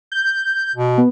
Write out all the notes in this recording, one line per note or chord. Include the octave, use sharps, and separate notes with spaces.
G6
B2
B3